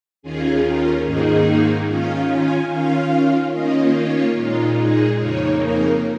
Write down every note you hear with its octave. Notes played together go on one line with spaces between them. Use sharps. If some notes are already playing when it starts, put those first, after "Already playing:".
D#2 D#3 C#4 F4 G#4
A#4
G#2 D#3 A#3 D#4 G#4
D#3 C#4 F4 F5
G#5
D#3 C#4 F4 F5
D#3 A#3 C#4 F4 D#5
C#5
A#2 G#3 D#4 F4
G#4
F2 C#3 A#3 D#4 C#5
A#4